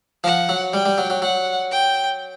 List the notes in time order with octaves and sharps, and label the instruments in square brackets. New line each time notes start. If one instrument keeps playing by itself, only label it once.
[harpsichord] F3 [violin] F#5
[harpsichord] F#3
[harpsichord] G3 [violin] G5
[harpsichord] G3
F#3
F#3
[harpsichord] F#3 [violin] F#5
[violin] G5